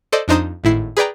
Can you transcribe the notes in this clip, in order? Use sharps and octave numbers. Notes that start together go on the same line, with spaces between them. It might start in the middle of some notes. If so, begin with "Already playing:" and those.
A4 C5 D5 D#5
F2 D4 D#4 C5 A#5 D#6
G#1 A2 E4 C7
G#4 B4 D5 G5 A#5